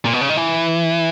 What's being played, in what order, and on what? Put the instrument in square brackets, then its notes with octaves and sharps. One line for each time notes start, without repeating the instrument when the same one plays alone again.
[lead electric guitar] A#2
B2
C#3
D#3
E3